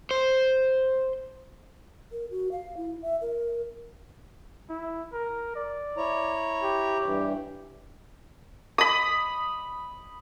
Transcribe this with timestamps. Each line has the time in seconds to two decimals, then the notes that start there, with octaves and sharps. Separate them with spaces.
0.11 C5
2.12 A#4
2.31 F#4
2.52 F5
2.77 E4
3.02 E5
3.21 A#4
4.70 E4
5.13 A#4
5.56 D5
5.97 E4 C#5 A#5
6.63 G4
7.04 G2 E3
8.78 B5 D#6